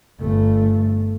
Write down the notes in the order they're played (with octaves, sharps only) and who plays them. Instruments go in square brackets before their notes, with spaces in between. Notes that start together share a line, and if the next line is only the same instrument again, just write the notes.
[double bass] G1 A3